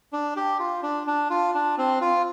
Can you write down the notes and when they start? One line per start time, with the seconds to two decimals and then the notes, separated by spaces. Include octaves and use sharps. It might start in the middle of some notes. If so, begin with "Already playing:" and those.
0.13 D4
0.36 G4
0.59 F4
0.83 D4
1.07 D4
1.30 F4
1.54 D4
1.78 C4
2.01 F4